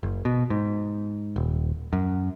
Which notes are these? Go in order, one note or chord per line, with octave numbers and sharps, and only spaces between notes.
F#1
B2
G#2
D#1
F#2